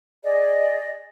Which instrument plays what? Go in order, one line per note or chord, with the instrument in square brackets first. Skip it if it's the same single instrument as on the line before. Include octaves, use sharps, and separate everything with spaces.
[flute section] G#4 D5 D#5